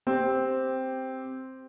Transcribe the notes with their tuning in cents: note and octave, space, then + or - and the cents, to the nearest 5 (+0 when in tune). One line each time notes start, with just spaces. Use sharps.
C4 +0 G4 +0